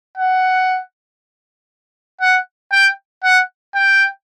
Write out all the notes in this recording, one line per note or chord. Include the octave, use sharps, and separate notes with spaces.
F#5
F#5
G5
F#5
G5